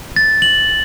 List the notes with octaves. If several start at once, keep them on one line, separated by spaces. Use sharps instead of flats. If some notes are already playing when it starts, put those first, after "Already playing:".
A6
F#7